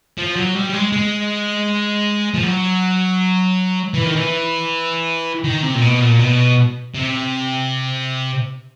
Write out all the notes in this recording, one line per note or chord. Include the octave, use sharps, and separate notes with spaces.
F3
F#3
G3
G3
G#3
G#3
F3
F#3
E3
D#3
E3
D#3
C3
A#2
B2
A#2
B2
C3